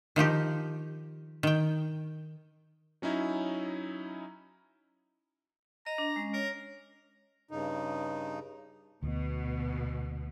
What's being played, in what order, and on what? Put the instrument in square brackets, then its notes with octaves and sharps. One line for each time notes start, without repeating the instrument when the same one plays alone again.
[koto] D#3 F3 D#4 G4
D#3 G5
[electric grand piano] F#3 C#4 D#4 E4
[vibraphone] D#5 [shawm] A#5
[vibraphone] D4
G#3 C#4 D#5
[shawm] A#4 [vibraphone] C#5
[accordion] G2 C#3 D#4
[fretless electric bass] D2 [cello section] B2